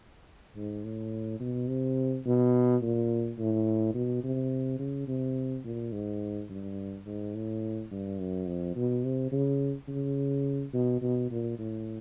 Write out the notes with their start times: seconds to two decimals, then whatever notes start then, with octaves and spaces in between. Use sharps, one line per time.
0.56 G#2
0.84 A2
1.40 B2
1.68 C3
2.26 B2
2.82 A#2
3.39 A2
3.94 B2
4.23 C3
4.79 C#3
5.08 C3
5.65 A#2
5.92 G#2
6.50 G2
7.06 G#2
7.35 A2
7.91 G2
8.19 F#2
8.47 F2
8.76 B2
9.04 C3
9.32 C#3
9.88 C#3
10.73 B2
11.02 B2
11.31 A#2
11.59 A2